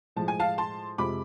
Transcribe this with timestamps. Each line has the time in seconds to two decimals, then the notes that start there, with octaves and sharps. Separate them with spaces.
0.16 A2 F3 G#3 A5
0.28 G#5
0.40 F5 A5
0.58 A5 C6
0.98 F2 C3 F3 G#3 B5 D6